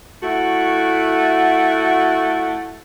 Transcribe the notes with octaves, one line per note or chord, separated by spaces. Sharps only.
A3 E4 F#4